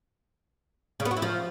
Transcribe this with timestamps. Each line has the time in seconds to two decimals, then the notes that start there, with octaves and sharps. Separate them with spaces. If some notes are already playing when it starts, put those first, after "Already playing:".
1.00 C#3
1.05 B3
1.11 F#4
1.17 E4
1.22 F3